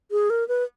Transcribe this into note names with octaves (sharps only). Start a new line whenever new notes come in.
G#4
A#4
B4